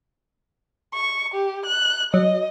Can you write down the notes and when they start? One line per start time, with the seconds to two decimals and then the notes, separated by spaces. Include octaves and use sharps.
0.93 C#6
1.34 G4
1.66 F#6
2.14 F#3 D#5